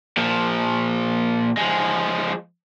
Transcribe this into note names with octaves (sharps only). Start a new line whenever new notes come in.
A#2 F3
F3 G#3